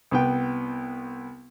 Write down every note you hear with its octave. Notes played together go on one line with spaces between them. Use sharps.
C2 B3 G5